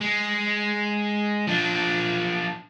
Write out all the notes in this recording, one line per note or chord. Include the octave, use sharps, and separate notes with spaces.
G#3
F3 D4